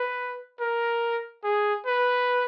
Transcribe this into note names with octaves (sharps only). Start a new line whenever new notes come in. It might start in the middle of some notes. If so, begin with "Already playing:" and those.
Already playing: B4
A#4
G#4
B4